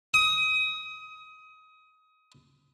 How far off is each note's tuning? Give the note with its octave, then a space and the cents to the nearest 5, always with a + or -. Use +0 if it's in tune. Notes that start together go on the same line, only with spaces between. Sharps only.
D#6 +25